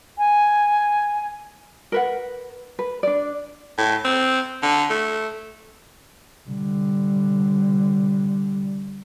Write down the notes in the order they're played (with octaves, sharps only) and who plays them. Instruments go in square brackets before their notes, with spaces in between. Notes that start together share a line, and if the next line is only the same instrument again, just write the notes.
[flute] G#5
[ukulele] A#4 B4 F#5
B4
D4 D5
[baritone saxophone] A2
C4
D3
A3
[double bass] D3 G3